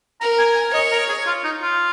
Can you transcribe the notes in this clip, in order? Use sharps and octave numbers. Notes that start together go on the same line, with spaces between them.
A#4 A#5
G#5
G#5
C#5 D#5
A#4
G#4
F4
D#4
F4